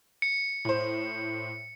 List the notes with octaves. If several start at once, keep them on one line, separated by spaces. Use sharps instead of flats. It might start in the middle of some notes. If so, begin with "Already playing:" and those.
C#7
A2 C5